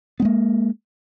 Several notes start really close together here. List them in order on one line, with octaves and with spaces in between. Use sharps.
B3 G#3 A#3